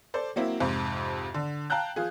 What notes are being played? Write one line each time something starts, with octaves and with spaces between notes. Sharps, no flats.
A4 C5 D5
F#3 A#3 C4 E4
F2 G#2 C3
D3
F5 G5 A5 A#5 F#6 G6
F3 F4 G#4